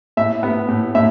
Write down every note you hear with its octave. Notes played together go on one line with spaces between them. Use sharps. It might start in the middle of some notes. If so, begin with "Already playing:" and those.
A2 E5
B3
A2
A2 E5